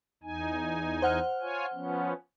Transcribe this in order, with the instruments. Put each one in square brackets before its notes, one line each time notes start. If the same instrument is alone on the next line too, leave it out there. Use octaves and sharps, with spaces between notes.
[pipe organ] E2 D#4 G#5
[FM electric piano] C5 F#5 F6
[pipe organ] F4 C#5 G#5
F3 B3 C#4